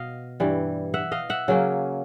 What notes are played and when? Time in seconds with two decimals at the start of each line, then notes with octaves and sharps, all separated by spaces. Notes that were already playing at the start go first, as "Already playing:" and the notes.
Already playing: B2 D#5 F5
0.40 G2 E3 G3
0.94 E5 F#5
1.12 D#5 F5
1.30 E5 F#5
1.48 C#3 F#3 A#3 C#4